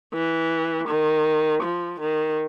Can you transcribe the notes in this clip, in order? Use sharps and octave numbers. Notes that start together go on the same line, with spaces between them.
E3
D#3
F3
D#3